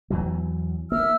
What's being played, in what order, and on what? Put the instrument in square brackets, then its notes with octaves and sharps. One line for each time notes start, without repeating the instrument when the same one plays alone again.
[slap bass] E2 E3 F#3
[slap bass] A#3 [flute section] E5 E6 F6